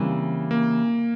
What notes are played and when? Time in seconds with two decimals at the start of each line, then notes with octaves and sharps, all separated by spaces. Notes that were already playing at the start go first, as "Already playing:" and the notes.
Already playing: C#3 E3 G3 A#3 C4
0.51 A#3